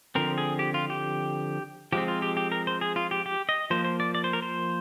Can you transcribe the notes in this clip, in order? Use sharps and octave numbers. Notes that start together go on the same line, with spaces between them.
D3 F3 C4 A#4
G#4
G4
F4
G4
F3 G#3 C4 G4
F4
G4
G4
A#4
C5
G#4
F4
G4
G4
D#5
F3 A#3 C5
C5
D5
D5
C5
A#4
C5